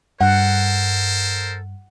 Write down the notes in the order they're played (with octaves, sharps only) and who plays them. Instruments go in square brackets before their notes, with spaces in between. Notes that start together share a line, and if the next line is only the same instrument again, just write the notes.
[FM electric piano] G2 [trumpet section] A4 A#4 C5 [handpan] F#5